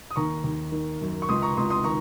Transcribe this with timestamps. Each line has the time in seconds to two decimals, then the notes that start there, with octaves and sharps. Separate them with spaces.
0.11 D#6
0.16 D#2 A#5 C#6
0.44 D#2
0.72 D#3
1.01 F#2
1.22 C#6
1.29 C#2 C6 D#6
1.42 A#5 C#6
1.57 C#2 C6 D#6
1.70 C6 D#6
1.84 D#3 A#5 C#6